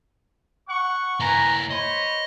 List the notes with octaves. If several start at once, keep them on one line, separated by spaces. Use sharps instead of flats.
F#5 C#6
A#3 E4 B4 G#5 A#5
C5 C#5 D#5 B5